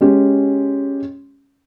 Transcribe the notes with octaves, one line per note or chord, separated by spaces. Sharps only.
G#3 C#4 G4